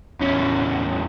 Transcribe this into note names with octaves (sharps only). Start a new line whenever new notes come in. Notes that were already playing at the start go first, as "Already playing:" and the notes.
E2 C#4